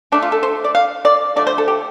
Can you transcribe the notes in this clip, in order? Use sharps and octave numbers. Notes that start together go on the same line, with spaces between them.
D3 A3 D4
F4
A4
C5
D5
F5
D5
D3 F3 A3 D5
C5
A4
G4